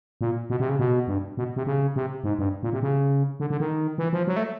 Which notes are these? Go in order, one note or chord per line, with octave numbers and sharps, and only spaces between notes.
A#2
B2
C3
C#3
B2
G2
B2
C3
C#3
C3
G#2
G2
A#2
C3
C#3
D3
D3
D#3
E3
F3
F#3
A3